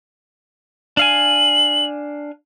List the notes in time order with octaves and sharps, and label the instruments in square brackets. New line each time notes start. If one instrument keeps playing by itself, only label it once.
[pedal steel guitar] D4 F5 G#5 [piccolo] F#7